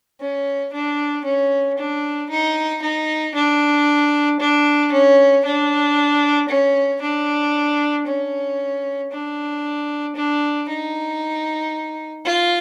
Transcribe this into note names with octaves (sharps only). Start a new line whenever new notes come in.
C#4
D4
C#4
D4
D#4
D#4
D4
D4
C#4
D4
C#4
D4
C#4
D4
D4
D#4
F4